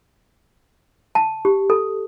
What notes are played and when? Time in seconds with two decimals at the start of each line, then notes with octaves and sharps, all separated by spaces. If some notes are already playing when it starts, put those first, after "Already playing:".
1.15 A5
1.45 G4
1.70 A4